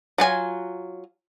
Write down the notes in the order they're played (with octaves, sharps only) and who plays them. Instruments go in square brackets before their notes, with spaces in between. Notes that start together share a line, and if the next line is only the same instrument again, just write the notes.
[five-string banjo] F#3 F4 G#5